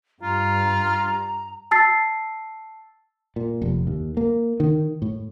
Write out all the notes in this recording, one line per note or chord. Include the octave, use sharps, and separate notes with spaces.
G2 F4 A#5
A5 E6 A6 C7
A#2
F1
D#2
A#3
D#3
A2